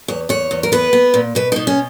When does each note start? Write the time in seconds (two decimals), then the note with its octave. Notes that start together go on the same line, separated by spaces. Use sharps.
0.08 E2 C#5
0.29 E2 C#5
0.51 E2
0.63 A#4
0.72 B3 B4
0.93 B3
1.14 A#2
1.35 B2 B4
1.52 B2 D#4
1.67 C#4